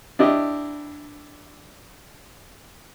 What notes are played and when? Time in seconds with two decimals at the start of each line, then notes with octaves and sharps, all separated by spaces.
0.19 D4 E4 G4 D#5